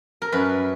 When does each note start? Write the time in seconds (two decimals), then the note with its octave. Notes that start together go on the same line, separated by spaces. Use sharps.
0.22 A#4
0.32 F#2 B4